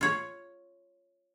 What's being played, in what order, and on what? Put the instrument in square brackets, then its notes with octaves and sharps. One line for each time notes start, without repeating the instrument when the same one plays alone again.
[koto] F4 C#5